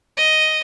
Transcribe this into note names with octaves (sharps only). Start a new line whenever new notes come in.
D#5